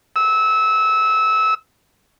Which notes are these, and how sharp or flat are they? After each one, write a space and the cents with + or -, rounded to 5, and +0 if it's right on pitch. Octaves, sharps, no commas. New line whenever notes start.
E6 -25